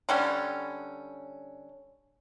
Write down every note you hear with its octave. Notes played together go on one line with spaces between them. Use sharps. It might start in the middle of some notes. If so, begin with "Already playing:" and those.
D3 G3 C#4